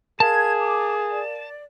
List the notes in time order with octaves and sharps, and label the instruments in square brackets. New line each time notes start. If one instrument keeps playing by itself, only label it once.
[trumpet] G#4 [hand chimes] A#4 F5 [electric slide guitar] A5 [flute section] G#6
[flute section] D6
D5